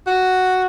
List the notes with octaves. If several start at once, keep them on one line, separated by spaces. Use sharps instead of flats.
F#4